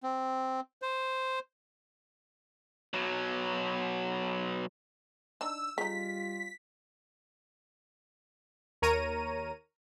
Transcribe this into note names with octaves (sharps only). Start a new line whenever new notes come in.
C4
C5
B2 F#3
D4 D#4 E6
C#3 G3 D#4 F4 B6
D#2 A#4 C#5 A#5 D#7